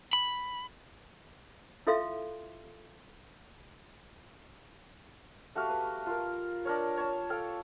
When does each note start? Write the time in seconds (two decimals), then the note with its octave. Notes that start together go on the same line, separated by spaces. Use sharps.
0.13 B5
1.87 E4 F4 A4 E5 F5 C6
5.55 A3 F#4 G4 F5
5.69 B4
6.06 F4 A#4
6.65 D4 A#4 C#5
6.97 C#5 A5
7.30 A4 F5 G5